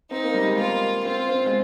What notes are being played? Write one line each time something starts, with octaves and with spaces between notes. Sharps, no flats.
C4 D#4
A#3
G3
G#3
A#3 F4
C4 F4
C4
G#3